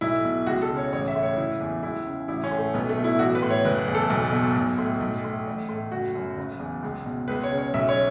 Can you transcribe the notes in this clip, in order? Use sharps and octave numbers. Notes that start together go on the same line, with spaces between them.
B1 E4
B2
C#2 F#4
A4
C#3
C#5
A1 C#5
E5
A2
C#5
F#1 E4
E2
C#2 E4
C#3
A1 E4
C#4
A2
A3
B1 B3
A3
B2
E4
A1 F#4
B4
A2
C#5
F#1 B4
E2
A4
B1
B2
B1
A2
B1
A2
A1
A2
F#1 F#4
F#2
F#1
E2
C#2
B2
C#2 B4
C#5
C#3
C#5
B1 E5
C#5